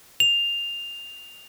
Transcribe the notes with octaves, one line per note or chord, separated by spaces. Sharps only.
F7